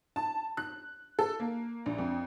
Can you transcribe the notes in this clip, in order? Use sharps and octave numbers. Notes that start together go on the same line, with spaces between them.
A5
F#6
A4
A#3
A#1
F2